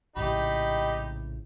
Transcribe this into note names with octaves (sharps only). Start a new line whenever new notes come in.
A#1 A2 C#3 D#4 G4 B5